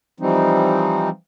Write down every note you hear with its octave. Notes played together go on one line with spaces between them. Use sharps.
E3 F3 G3 C4 D#4